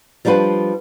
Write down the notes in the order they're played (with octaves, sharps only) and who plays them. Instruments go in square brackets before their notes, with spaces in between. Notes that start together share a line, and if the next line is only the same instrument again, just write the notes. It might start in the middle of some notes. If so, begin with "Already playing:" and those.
[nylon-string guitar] F3 G3 D4 F4 B4